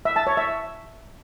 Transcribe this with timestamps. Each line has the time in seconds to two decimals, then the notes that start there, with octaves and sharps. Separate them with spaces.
0.05 E5
0.16 A5
0.27 C#5
0.37 E5